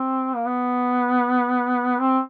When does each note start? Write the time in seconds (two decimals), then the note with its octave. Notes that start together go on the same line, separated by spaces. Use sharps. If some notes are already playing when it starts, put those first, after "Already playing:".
Already playing: C4
0.35 A#3
0.46 B3
1.99 C4